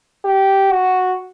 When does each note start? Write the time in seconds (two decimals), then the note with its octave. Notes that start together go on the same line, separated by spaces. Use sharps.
0.25 G4
0.71 F#4